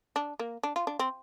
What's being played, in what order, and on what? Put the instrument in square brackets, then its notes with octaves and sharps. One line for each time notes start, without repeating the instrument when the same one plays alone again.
[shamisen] D4
A#3
D4
F4
D4
C4